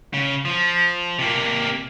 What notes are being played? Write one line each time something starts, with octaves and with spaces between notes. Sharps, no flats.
C#3
F3
C3 A#3